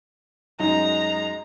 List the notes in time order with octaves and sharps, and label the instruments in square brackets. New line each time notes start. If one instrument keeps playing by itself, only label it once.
[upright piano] F#2 D#4 [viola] G#3 A#5